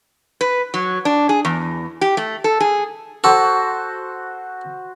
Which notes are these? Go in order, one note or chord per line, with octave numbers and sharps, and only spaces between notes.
B4
F#3
D4
G#4
E2
G4
A3
A4
G#4
F#4 A4 C5